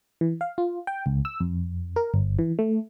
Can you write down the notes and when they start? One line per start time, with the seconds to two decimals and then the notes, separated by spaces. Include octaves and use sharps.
0.21 E3
0.41 F5
0.58 F4
0.87 G5
1.06 C#2
1.25 E6
1.40 F2
1.96 A#4
2.14 G1
2.39 E3
2.59 A3